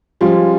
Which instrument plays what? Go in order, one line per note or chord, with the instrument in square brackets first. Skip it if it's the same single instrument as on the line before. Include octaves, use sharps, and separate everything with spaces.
[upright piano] F3 G3 [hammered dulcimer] G#3 C#4 F4 G#4